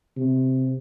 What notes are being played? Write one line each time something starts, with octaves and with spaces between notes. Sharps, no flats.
C3